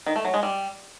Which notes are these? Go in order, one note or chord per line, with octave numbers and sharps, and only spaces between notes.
D#3
A3
F#3
G#3
G3